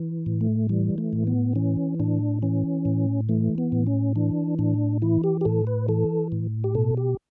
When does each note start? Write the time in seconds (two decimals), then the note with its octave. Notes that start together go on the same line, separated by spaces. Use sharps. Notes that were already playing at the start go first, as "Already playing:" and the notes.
Already playing: E3
0.26 A2
0.41 A3
0.69 E3 G3
0.98 A3
1.13 A2
1.27 B3
1.56 E3 C#4
2.00 A2 D4
2.42 E3 C#4
2.85 A2
3.29 E3 A3
3.58 B3
3.72 A2
3.87 C#4
4.16 E3 D4
4.59 A2 D4
5.02 E3 E4
5.24 G4
5.41 G4
5.45 A2 A4
5.67 B4
5.88 E3 A4
6.32 A2
6.64 G4
6.75 B2 A4
6.97 G4